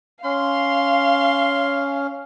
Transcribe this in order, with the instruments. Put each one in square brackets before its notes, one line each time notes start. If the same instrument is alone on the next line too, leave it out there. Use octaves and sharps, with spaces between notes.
[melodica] C#4 [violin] F5 [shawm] C6